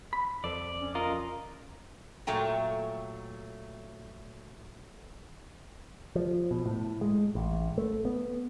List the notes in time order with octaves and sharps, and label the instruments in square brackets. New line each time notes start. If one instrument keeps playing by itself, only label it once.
[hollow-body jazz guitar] B5
[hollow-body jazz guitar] F2 A4 C5 [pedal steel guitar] D5
[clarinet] C#4
[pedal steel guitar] F4 A#4 D#5
[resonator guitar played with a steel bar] A#2 F#3 A3 G5 A#5
[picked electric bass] F3
B2
A2
G#3
A1
A3
B3